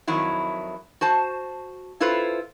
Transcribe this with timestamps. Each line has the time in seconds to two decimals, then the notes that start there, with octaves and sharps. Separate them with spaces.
0.07 F2 D#3 F#3 E4
1.01 F#4 C5 A5
2.00 E4 F4 A4 B4 C5